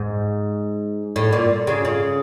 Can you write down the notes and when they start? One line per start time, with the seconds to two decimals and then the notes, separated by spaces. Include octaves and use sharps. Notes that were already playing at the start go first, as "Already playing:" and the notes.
Already playing: G#2
1.16 A2
1.33 A#2
1.67 C#3
1.85 C#3